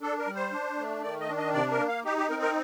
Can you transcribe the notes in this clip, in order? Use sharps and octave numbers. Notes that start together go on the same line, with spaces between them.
D4 A4
A#4
G3
C5
D4
A3
D#3 D5
D#5
D4
D#5
C3 D5
A#4
A#3
F5
D#4 G4
G4
C4 A#4
A#4